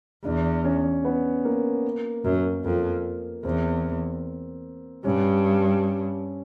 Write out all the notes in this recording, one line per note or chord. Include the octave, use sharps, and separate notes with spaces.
E2 D4
C#4
B3
A#3
F#2
F2
E2 C4
G2 C#4